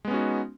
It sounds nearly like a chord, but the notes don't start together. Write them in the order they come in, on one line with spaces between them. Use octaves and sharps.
G#3 B3 C#4 F#4 D#4